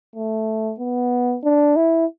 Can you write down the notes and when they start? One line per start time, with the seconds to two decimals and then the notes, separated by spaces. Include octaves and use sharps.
0.16 A3
0.79 B3
1.44 D4
1.76 E4